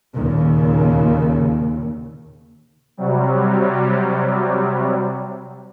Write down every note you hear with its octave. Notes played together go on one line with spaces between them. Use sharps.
D#2 A#2 C#3
C3 F#3 G3